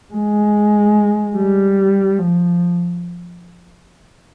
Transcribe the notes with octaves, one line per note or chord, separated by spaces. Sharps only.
G#3
G3
F3